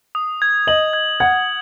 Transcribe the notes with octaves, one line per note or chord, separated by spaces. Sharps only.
D#6
G#6
D#5 F#7
G#6
F#5 G#6